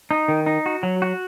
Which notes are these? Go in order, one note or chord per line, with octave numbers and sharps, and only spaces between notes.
D#4
D#3
D#4
F#4
F#3
F#4